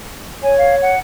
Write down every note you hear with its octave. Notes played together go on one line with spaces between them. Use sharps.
C#5 G#5
F5
F#5